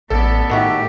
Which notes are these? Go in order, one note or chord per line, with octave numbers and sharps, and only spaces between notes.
A1 B3 A4 D5
A2 D#3 F#4 G4 E5